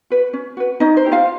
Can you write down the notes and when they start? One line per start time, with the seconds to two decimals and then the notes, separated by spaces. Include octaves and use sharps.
0.10 F#4 B4
0.33 C#4
0.57 F#4 B4
0.80 C#4 D#4 D#5
0.97 C5
1.04 E4 G4
1.12 F4 F5